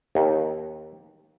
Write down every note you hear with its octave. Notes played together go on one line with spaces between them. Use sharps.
D#2